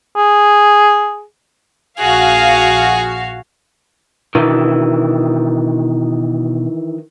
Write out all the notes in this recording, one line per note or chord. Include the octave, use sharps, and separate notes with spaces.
G#4
A#1 F#4 G#4 F5
B2 D#3 E3 D4 F#4